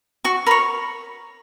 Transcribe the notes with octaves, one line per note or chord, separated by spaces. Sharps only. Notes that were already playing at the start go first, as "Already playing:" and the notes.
F#4 C#6
A#4 C#5 B5